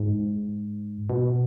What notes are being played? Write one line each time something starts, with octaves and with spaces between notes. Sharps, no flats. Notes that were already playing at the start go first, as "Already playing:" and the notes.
Already playing: G#2
B2